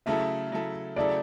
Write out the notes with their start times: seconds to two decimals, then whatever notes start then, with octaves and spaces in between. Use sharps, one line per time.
0.06 C#3 F#3 A3 E4 A4 E5
0.52 C#3 F#3 A3 E4 A4
0.96 C#3 F#3 A3 E4 A4 D5